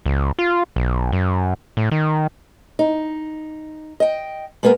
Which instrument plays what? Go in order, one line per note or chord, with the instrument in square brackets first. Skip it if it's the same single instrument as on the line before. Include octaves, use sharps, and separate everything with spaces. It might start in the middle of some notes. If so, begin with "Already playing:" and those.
[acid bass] C#2
F4
B1
F#2
A2
D#3
[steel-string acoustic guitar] D#4
D#5 G5
G#3 A#3 B3 G#4 A#4